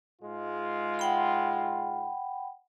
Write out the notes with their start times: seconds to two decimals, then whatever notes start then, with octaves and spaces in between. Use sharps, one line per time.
0.22 G#2 G#3 F4
0.99 F#5 G5 B5